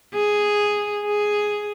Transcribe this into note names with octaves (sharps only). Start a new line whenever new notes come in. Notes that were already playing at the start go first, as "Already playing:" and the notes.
G#4
G#4